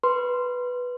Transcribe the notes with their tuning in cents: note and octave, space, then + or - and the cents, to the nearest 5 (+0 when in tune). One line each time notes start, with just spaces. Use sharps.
B4 -5 C6 +0